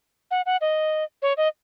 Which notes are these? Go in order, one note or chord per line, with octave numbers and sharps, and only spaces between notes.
F#5
F#5
D#5
C#5
D#5